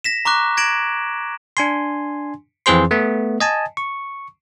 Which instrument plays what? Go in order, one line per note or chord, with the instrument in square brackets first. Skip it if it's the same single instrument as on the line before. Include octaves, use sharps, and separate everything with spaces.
[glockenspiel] A#6 B6 E7
A#5 C#6 D6 F#6
G#6 A#6 D7 E7 F#7
[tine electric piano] D4 G#5 C6
F2 E3 C4 G#4 C5 C6
A3 B3
D#5 G#5 A5
C#6